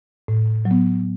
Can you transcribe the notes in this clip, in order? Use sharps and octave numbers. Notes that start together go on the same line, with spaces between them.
A2
F#3
B3